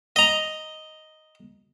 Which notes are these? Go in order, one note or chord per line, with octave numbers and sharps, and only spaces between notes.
D#5 A#5